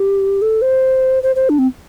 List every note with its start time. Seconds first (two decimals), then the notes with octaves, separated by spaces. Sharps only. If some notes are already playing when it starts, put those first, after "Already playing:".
Already playing: G4
0.42 A4
0.62 C5
1.23 C5
1.36 C5
1.49 D4
1.58 C4